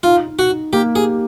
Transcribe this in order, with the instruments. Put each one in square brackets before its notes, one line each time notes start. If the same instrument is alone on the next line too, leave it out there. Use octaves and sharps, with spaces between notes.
[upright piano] D#4 [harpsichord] F4
[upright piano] D#4
[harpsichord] F#4
[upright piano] D#4
[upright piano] A#3 [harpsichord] G4
[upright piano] G4 [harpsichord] G#4